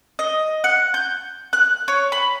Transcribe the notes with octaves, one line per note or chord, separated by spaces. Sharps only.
D#5
F#5
G6
F#6
C#5
B5